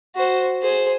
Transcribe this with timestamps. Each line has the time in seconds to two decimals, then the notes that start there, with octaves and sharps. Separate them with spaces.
0.16 F#4 C5
0.62 G#4 C5